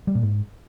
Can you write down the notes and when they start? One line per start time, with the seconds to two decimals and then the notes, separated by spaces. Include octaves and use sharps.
0.07 G3
0.15 A#2
0.23 G#2